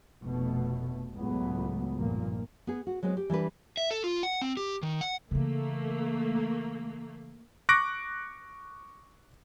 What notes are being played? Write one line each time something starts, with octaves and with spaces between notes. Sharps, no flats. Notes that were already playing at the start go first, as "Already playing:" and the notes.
F1 B2 A3
C#2 A2 F#3 A3 B3
F1 G2 A#2 F3 A#3
B3 G#4
F#4
F#3 G#3 B3 C4
G4
E3 G3 D4 B4
E5
A4
F4
F#5
C4
G4
D#3
F#5
C#3 E3 A3 A#3
C#6 D6 F#6 A#6 D7